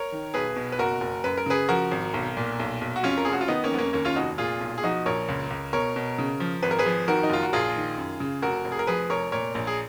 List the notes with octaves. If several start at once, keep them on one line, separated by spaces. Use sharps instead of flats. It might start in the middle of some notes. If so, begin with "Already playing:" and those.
Already playing: A#4 C#5
D#3
B1 G#4 B4
B2
B4
F#1 F#4 A#4
F#1
F#2 B4
A#4
C#3 G#4 B4
F3 F#4 A#4
G#1
B1
A#2
B1
B1
F#4
F2 C#4 F4
A#4
F1 G#4
F#4
F4
D#3 B3 D#4
A#3 C#4
F2 B3
A#3 C#4
D#2 A#3 C#4
C#4 F4
F1 D#4 F#4
A#2 F4 G#4
B1
G#4
F3 D#4 F#4
A#1 A#4 C#5
C#2
C#2
B2 A#4 C#5
B2
C#3
F3
G#1 B4
A#4
G#4 B4
F3
D#3 F#4 A#4
D#4
F#1 F4
F#4
A#1 F4 G#4
D#3
F#2
C#3
F1 F#4 A#4
F1
G#4
A#4
F3 G#4 B4
F1 A#4 C#5
A#2 A#4 C#5
A#1
G#4